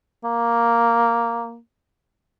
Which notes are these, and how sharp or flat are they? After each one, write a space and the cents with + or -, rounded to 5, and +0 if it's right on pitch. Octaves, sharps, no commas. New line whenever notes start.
A#3 +0